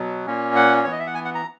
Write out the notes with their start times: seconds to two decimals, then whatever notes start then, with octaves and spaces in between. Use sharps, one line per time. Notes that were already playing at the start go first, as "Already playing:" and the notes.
Already playing: B2 F#3
0.26 A#2 A#3 C#4
0.56 F#5
0.84 E3 B3 C#5
0.92 D#5
1.00 E5
1.07 F#5
1.15 G#5
1.25 F#5
1.35 A#5